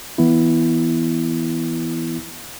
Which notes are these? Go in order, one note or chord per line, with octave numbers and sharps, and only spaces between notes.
E3 B3 E4